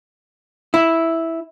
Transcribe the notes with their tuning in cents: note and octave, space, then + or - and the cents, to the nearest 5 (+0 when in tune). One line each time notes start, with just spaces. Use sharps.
E4 -5